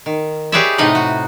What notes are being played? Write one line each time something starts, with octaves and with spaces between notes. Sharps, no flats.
D#3
G4 G#4 B4 C#5 D5 E5
A2 C3 D#4 B4 D#5 F#5
F#4